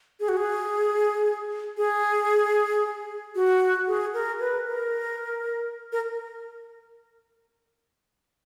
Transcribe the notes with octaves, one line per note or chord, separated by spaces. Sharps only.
G#4
F#4
G#4
G#4
F#4
G#4
A#4
B4
A#4
A#4